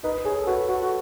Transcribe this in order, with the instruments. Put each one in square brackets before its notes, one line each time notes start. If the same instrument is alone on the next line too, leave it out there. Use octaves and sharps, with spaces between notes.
[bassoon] D#4 [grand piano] B4
[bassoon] G#4 [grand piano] C#5
[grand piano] A4
[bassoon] F#4 [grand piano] B4
[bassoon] F#4 [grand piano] A4
[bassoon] F#4